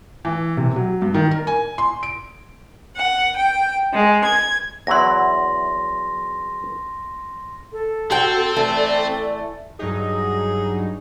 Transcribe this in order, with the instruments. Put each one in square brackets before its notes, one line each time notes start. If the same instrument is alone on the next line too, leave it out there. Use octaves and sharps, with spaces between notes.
[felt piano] E3
C3
F#3
G2
D#3
A#4
G#5
C6
D7
[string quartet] F#5
G5
G#3
G#6
[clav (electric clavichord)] E2 F#3 E4 [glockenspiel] C6 A#6
[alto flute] A4
[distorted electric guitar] C4 [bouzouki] F#4 G5
[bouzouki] E3 A3 [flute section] D5
[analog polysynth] G2 F#3 D#4 [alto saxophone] G#4